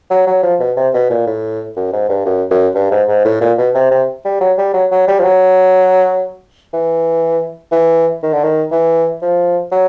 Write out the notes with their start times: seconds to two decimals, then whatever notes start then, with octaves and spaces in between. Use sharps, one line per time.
0.10 F#3
0.27 F#3
0.43 F3
0.60 B2
0.77 C3
0.93 B2
1.10 A#2
1.27 A2
1.76 F#2
1.93 G#2
2.09 G2
2.26 F#2
2.51 F#2
2.75 G2
2.91 G#2
3.08 G#2
3.25 A2
3.41 A#2
3.58 B2
3.75 C3
3.91 C3
4.25 G3
4.41 F#3
4.58 G3
4.73 F#3
4.91 F#3
5.08 G3
5.19 F3
5.24 F#3
6.73 E3
7.72 E3
8.23 D#3
8.33 D3
8.44 D#3
8.71 E3
9.22 F3
9.72 F#3